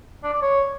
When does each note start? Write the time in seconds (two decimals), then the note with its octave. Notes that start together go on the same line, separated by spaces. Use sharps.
0.23 D4
0.33 D5
0.42 C#5